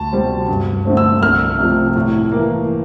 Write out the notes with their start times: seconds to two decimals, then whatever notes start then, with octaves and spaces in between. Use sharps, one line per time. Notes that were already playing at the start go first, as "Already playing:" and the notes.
Already playing: D2 A5
0.13 C3 G3 C4
0.48 G2
0.85 D3 A3 C4
0.97 E6
1.21 C2 F6
1.59 C3 F3 A3
1.96 A2
2.32 E3 A#3